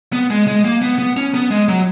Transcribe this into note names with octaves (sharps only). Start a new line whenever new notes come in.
B3
G#3
G#3
A#3
B3
B3
C#4
B3
G#3
F#3